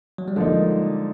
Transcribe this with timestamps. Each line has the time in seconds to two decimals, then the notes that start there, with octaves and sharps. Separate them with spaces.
0.18 F#3
0.28 G3
0.36 D3 F3 G#3 A#3 D#4